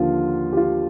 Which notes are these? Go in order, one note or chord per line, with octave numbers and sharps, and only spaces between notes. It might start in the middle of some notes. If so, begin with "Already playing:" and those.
Already playing: D#2 D3 F3 F4
G4
F4